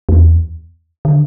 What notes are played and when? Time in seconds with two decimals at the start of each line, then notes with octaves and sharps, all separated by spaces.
0.09 E2
1.05 D3